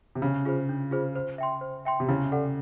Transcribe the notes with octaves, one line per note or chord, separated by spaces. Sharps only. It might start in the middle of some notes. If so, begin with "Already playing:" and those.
C3
C#3 D4
F4 G#4 C5
D4
F4 G#4 C5
C5
E5 G5 C6
C5
E5 G5 C6
C3
C#3 E4
A4 D5 F#5